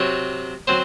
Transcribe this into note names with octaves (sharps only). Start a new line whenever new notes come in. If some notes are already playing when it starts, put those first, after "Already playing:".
Already playing: C3 F#3 C4 C#5
F#3 C4 C5